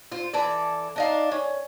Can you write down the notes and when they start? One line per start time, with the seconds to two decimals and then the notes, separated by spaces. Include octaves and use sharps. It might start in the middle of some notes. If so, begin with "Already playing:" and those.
0.12 F4 C5
0.33 E3 A4 D5
0.96 D4 D#4 F5
1.31 C#4